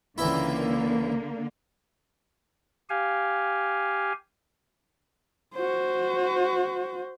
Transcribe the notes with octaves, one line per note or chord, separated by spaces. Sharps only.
C#2 D3 E3 A#3 E4
G4 F5 G#5
F#4 C5